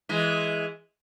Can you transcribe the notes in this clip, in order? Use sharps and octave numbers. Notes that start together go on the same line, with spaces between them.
E3 G#3